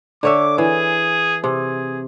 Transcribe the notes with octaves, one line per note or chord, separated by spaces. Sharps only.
D3 C#5 E5 D6
E3 G#4
C3 G#4